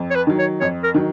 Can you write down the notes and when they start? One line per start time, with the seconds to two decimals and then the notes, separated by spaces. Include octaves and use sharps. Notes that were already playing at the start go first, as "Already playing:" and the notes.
Already playing: F2
0.11 C#5
0.15 B4
0.27 D#3 F#3
0.39 C#5
0.61 F2 C#5
0.83 A#4
0.94 D#3 F#3